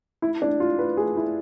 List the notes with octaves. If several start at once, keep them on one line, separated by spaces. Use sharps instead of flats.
E4
D4
F4
B4
G#4
E4